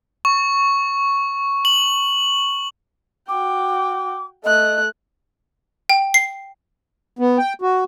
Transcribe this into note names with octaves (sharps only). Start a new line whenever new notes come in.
C#6
F#7
F#4 G5 D6
A3 D#5 F#6
G5
C7
B3
G5
F#4